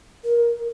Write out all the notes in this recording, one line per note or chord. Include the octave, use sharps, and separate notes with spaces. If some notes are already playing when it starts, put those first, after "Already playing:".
A#4